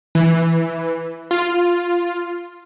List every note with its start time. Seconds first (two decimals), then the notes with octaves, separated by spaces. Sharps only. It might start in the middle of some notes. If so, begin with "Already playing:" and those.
0.15 E3
1.31 F4